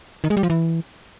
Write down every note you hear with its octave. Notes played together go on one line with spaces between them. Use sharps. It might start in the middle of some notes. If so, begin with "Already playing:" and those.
D#3
G#3
G3
F3
E3